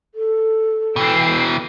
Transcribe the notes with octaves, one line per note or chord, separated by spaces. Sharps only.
A4
B2 E3 G5 E6 C7